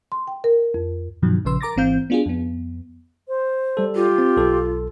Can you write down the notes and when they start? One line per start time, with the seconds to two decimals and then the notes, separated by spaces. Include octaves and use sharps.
0.12 C6
0.28 G5
0.44 A#4
0.74 F2
1.22 G2 B2 D#3 F3 F#3
1.45 A#1 C#3 F3 B4 C6 E6
1.61 A#4 A#5 D6 A6 A#6
1.76 G#1 E3 C4 F5 G6
2.10 B3 D4 F4 F#4 G#4
2.26 F2 B3
3.28 C5
3.77 G3 A4
3.95 F4 G4
4.18 C4
4.37 B1 A4